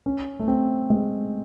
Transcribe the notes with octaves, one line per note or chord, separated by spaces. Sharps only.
C#4
A3
C4
G#3